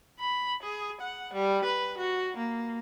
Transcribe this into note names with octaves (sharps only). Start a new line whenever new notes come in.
B5
G#4
F#5
G3
B4
F#4
A#3